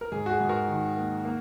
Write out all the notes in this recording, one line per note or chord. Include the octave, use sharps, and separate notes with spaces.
A#4
G#2 G#4
F#4
G#4
G#2
F#4 A#4
D#3
A#3
A#3